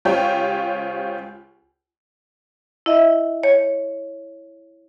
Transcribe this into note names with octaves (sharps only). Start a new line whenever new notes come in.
C#2 F4 G4 C5 C#5 G5
E4 D#5 E5
C#5